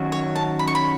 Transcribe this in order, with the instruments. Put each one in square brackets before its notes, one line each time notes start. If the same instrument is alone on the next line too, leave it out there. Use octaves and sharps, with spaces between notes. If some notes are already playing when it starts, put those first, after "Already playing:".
Already playing: [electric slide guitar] F#2 D#3 F#3 C#4 F#4
[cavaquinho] C#5
A5
B5
C#6
B5